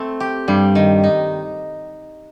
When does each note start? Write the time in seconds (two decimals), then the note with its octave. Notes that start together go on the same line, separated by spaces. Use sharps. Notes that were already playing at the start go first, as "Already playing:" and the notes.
Already playing: A3 C4
0.20 G4
0.48 G2 G3
0.75 D#3
1.04 D#4